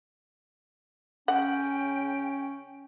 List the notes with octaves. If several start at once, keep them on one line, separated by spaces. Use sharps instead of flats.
C#3 C#4 F#5 G5